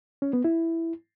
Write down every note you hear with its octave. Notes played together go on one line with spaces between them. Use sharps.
C#4
B3
E4